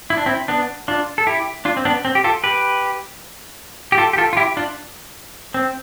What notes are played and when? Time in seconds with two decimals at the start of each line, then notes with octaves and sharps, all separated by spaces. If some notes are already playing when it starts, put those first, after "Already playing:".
0.10 E4
0.17 D4
0.26 C4 E4
0.48 B3 D4
0.88 D4 F4
1.18 A4
1.27 E4 G4
1.65 D4 F4
1.77 C4
1.85 B3 D4
2.05 C4
2.15 G4
2.24 F4 A4
2.44 G4 B4
3.92 G4
3.98 F4 A4
4.13 G4
4.18 F4 A4
4.33 F4
4.37 E4 G4
4.57 D4 F4
5.54 C4